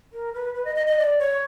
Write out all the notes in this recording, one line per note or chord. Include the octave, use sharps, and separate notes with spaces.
A#4
B4
B4
D#5
D#5
D#5
D5
C#5